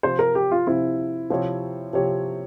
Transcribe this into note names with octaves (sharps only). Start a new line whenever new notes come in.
C3 F3 C4 C5
A#4
G4
F4
C3 F3 C4 E4
C3 F3 C4 G4 C#5
C3 F3 C4 G4 C#5